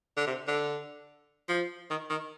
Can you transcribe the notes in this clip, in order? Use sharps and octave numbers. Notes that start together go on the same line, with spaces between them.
D3
C3
D3
F3
D#3
D#3